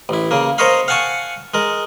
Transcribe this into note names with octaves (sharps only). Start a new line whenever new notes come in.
A1 E4
C#3 A#3
A#4 C5 C#5 D#5 F5 B5
F5 F#5 G#5 A5 C#6
G#3 A#4